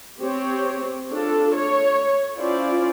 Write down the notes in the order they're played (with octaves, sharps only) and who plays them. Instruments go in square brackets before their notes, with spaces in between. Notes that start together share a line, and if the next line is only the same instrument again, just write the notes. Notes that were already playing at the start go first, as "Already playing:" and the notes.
[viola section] C4 G4 C#5
D4 F4 A4
C#5
C#4 E4 F4 C5 D5